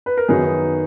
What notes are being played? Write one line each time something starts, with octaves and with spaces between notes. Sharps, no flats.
B4
A#4
F#2 D#3 F#3 B3 D#4 G#4